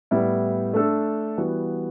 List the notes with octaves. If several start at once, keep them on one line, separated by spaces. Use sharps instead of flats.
A2 G3 B3 E4
A3 D4 A4
E3 G3 B3 F#4